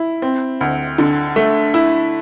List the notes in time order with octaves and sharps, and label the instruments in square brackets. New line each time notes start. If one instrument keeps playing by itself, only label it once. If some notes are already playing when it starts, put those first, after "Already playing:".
Already playing: [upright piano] E4
C4
D2
D3
A3
E4